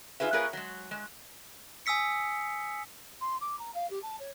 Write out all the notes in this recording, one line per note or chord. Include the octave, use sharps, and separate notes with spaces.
D#4 F4 G#4 B4 E5
B3 F4 G#4 A#4 B4 C#5
F#3 G#3
G#3
G#5 D#6 E6 B6 C#7
C6
D6
A#5
F5
G4
A5
C#5